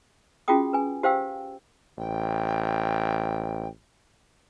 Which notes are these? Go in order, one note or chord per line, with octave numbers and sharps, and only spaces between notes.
C#4 F4 F#4 G#4 G5 D#6
B4 G#5
G4 C5 F5 G5 E6
A1 G5